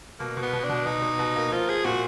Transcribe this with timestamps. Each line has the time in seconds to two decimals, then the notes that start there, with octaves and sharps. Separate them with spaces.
0.20 B2 A#3
0.37 B2
0.42 B3
0.53 B2
0.64 D4
0.70 B2
0.86 B2 D#4
1.02 B2
1.19 B2
1.36 A#3
1.52 F3 F4
1.68 F3 G#4
1.85 A#2 F#4